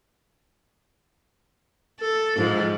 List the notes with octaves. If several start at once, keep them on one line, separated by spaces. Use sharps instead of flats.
A4
G#2 F3 G#3